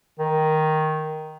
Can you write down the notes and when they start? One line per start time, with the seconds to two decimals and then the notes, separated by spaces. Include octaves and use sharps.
0.19 D#3